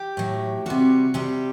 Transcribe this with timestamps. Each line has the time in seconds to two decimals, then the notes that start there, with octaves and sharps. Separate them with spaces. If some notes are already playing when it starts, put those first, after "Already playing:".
Already playing: G4
0.17 A2 F#3
0.66 C3 G3 F#4
1.14 C3 G3 G4